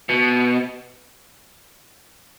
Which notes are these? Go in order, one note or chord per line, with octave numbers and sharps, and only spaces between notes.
B2